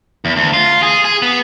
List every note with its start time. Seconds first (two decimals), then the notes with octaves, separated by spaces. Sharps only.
0.25 E2
0.36 D2
0.54 F4
0.83 G#4
1.04 G#4
1.22 B3